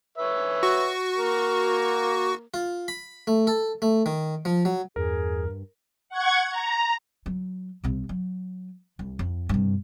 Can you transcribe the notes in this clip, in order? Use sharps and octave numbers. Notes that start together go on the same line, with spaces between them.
B4 C#5 E5
F#4 C#6
A#3 A#4
F4
B5
A3
A4
A3
D#3
F3
F#3
E2 G2 G#4 A#4
F#5 C#6 G#6
A#5
F#3
C2 C3
F#3
C2
F2
G2 C3